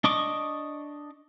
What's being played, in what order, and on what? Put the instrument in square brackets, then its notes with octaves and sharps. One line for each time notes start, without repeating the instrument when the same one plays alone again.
[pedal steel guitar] D4 D#5 C#6 D6